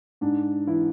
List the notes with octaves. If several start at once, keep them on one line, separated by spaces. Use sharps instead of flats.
G#2 D4
E3 E4